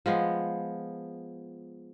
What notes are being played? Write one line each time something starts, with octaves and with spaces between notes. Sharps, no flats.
F3 G#3 B3